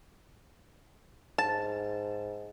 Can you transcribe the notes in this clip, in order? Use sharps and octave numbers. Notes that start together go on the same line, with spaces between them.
G#2 A5